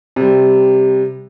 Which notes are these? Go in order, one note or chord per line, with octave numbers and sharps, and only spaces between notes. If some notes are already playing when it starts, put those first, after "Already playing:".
C3 G3